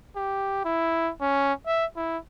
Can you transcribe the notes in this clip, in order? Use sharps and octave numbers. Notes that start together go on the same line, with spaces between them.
G4
E4
C#4
E5
E4